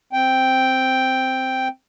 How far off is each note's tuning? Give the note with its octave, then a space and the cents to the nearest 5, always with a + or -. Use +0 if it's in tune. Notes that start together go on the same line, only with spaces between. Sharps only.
C4 +0 G5 +0